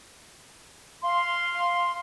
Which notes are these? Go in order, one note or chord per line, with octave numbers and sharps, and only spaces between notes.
F5 C6